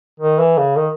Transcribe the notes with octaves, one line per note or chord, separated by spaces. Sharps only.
D#3
E3
C#3
D#3